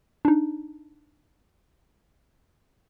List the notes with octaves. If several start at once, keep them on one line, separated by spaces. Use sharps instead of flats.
D4 D#4